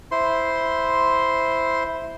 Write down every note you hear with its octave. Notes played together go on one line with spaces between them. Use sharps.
E4 C5 C6